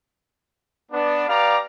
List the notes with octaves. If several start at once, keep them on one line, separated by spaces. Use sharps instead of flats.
B3 D4
B3 G4 D5 F5 A#5